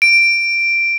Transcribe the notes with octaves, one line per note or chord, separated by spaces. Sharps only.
D7